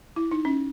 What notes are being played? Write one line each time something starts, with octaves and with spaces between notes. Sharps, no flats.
E4
D#4
C#4